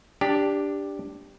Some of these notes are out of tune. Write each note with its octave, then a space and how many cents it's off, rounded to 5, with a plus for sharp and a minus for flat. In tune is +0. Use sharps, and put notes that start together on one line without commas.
D4 -5 G4 +5